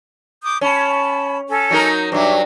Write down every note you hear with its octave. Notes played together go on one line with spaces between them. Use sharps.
D6 D#6 G6
C#4 A5 B5
C#4 A4
F#3 D#4 A#4
G2 F#3 E5 D6